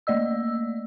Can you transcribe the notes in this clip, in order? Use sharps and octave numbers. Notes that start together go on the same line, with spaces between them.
A3 A#3 D5 D#5 E6